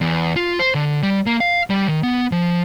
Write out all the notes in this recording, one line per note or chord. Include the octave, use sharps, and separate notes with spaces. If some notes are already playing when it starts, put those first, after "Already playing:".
E2
F4
C5
D3
G3
A#3
F5
G3
D#3
B3
F3